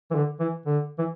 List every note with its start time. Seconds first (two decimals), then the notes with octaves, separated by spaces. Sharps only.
0.11 E3
0.15 D3
0.40 E3
0.66 D3
0.98 E3